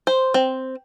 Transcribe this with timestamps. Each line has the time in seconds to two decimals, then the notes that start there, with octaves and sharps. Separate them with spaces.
0.07 C5
0.34 C4